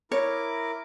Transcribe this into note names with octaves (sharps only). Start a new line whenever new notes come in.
E4 A#4 C#5 D6